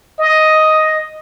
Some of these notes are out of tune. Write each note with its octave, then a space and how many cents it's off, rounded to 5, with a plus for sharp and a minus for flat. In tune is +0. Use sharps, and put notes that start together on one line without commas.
D#5 +5